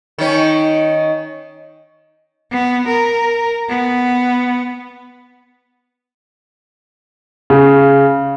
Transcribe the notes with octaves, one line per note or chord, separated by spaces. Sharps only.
D#3 C#4
B3
A#4
B3
C#3